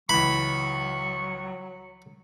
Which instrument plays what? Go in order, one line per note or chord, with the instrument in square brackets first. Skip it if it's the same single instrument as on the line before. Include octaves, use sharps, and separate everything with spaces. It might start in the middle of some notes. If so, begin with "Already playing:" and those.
[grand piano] C#2 E3 [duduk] F#3 [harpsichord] B5 [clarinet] C#6